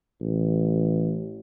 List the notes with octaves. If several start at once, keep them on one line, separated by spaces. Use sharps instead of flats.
A1